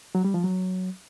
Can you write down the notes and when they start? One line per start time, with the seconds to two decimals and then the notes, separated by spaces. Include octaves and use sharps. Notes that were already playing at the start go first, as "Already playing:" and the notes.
0.15 F#3
0.24 G3
0.34 F3
0.44 F#3